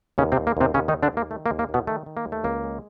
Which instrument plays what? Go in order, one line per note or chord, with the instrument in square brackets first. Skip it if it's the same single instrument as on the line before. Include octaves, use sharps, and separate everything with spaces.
[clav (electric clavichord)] D#2 C#3 C#4
C3 C4
D#2
A#3
D#2 C3 C4
D#2 C#3 C#4
D#3 D#4
D#2
D3 D4
D#2 A#3
D#3 A3
A#3
D#2
A#3
D#2
B2 B3
D#3 A3
D#3
A#3
D#2
A3
C#2 A#3
G#3